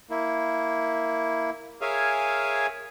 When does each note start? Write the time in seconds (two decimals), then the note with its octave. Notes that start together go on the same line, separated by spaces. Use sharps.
0.10 A#3 E4
1.81 G#4 A#4 C#5 E5 F5 G#5